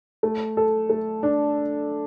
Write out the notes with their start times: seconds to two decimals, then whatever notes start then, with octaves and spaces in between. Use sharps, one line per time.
0.23 A3
0.57 A4
0.90 A3
1.23 D4